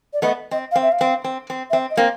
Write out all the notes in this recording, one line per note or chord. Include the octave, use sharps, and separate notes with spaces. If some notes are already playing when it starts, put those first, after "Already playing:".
D5
A3 B3 D#5
C4 D#5
F5
C4
E5
F5
C4
C4
C4
E5
C4
D#5
A#3 C4